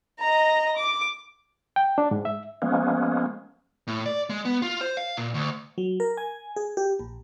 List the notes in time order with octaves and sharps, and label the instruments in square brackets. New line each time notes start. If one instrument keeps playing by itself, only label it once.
[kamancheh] D#5 A#5
D6
[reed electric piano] G5
D4
G#2
E5
[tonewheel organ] F3 G#3 A#3 B3 C#4
[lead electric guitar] A2
D5
G#3
B3
F4
C5
F5
A#2
D2
[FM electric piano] F#3
A#4
G#5
G#4
G4
A#1